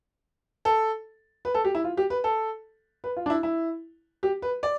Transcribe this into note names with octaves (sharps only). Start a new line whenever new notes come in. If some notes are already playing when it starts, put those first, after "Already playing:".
A4
B4
A4
G4
E4
F4
G4
B4
A4
B4
F4
D4
E4
E4
G4
B4
D5